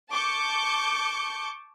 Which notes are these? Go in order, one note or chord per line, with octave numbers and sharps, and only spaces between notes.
A5 C#6 D6 G6 C#7